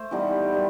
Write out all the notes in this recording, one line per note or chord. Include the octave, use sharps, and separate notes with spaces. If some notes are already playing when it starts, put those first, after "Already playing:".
Already playing: A3 C5
E3 G3 B3 D#4
D#3 G3